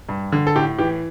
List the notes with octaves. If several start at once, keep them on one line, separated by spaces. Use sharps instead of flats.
G2
D3
A4
A2 G4
E3 G4